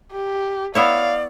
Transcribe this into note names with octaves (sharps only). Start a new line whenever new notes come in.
G4
B3 E4 C#5 D5 F5